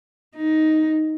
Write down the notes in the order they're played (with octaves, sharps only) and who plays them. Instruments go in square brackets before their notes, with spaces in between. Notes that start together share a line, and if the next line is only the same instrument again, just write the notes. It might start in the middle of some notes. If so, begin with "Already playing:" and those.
[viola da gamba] D#4